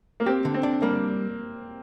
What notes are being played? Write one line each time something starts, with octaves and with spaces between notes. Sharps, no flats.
A#3
C4 G4
D3
C4
D4
G3 A#3